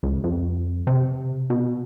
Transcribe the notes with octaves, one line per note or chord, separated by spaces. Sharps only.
C#2
F2
C3
B2